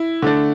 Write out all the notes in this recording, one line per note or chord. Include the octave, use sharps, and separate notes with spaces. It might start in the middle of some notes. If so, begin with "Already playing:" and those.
Already playing: E4
D3 A3 D4